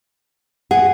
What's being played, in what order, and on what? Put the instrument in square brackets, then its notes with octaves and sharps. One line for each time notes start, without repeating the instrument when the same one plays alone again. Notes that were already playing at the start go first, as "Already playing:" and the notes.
[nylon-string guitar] G#4 [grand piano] F#5